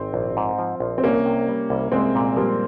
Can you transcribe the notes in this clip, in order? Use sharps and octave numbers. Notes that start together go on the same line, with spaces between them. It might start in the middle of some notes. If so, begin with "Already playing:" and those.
Already playing: G#1 C4
A#1
G#2
F3
A#1
C4
C2 A#3 C#4
C3
G3
C2
C2 G#3 C4
A#2
F3 G3 A#3